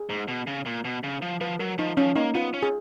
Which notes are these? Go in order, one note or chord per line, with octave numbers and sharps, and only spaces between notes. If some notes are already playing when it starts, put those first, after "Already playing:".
Already playing: G#4
G#2
B2
C#3
A#2
B2
C#3
F3
F3 B4
F#3 A#4
F3 D#4
F3 C#4
A#3 D#4
B3 F4
C#4
G#4